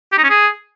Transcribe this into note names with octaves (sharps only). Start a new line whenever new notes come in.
G4
D#4
C#4
G#4